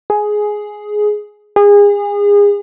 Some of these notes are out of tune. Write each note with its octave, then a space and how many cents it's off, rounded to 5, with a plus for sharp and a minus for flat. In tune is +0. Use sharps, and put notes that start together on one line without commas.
G#4 +10
G#4 -30